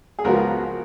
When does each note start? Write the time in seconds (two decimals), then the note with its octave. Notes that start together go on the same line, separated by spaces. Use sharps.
0.19 G#4
0.24 C#2 C#3 F3 G#3 B3 F#4 A#4